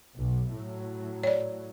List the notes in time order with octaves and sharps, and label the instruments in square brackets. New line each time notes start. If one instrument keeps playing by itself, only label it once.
[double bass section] B1
A2 F#3
[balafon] C#5 D5